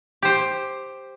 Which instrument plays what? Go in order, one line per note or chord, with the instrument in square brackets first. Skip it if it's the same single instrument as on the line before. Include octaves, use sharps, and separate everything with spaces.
[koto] G4 C5